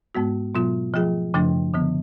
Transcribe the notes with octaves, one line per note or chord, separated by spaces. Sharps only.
G#2 G#3 B3 F#4
B2 F#3 B3 F4
F3 A3 F4 G#4
F#2 C#3 F3 A3 D4
D3 F3 B3